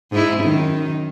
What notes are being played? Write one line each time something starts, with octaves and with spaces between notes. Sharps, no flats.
G#2 E4
F#2 D#3